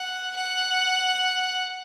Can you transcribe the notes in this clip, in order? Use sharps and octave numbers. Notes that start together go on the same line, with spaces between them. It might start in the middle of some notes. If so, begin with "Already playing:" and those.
Already playing: F#5
F#5